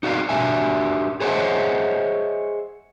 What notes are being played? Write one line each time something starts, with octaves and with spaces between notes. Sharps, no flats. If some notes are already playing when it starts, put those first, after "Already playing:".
D#4 F#4 D5 F5
D4 F#4 G4 E5 G#5
G#4 C5 C#5 D#5 E5 F#5